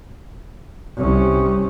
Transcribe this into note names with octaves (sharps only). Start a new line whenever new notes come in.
C2 C#4